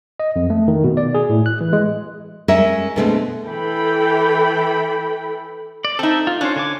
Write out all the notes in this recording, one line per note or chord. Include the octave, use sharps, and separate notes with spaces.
D#5
F2
A3
D#3
B2
D5
G#4
A2
F#6
E3
G#3
G#3 C#4 A#4 E5
B2 D3 G#3 A3 B3 C4
E3 A4 G5 B5
D5
C4 D#4 A4 E5
F4
C#4 D4 C5
D3 G#5 D6